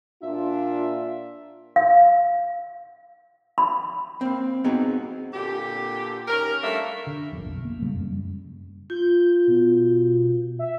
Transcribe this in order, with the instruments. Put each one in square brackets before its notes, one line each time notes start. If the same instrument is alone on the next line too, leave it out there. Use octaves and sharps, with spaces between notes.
[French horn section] A#2 D4 F4 [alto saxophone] E5
[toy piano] F5
B5
[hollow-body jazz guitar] A#3 C4
B3 C4 D#4 F#4 G#4
[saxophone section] A#2 D3 G4
D#2 C#4 A#4
G3 A3 A#3 D4 E5
[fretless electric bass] D3
G1 F2
B1
A#3
F2 C#3 G3 G#3
F#2 G3
[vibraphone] F4 [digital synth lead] G6
[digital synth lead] B2
E5